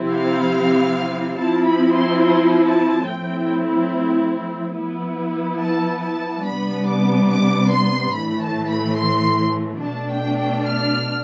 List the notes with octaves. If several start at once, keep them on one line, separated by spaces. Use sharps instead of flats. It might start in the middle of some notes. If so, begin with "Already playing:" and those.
Already playing: C3 F3 C4 E4
F5
F3 C4 E4 A5
B5
C6
C6
A5
A2 F3 C4 E4 G5
F3 B3 E4
A5
A5
C3 G3 B3 D4 B5
D6
D6
C6
A2 E3 A3 B5
A5
B5
C6
B2 A3 D4 A5
G5
G5
F6